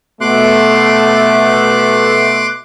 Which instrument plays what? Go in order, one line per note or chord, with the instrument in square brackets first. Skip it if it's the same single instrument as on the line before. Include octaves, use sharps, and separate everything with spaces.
[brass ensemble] B2 A3 [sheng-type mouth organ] C6 D6 F#6